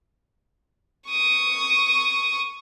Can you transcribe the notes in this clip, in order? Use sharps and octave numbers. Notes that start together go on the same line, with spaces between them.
C#6 D#6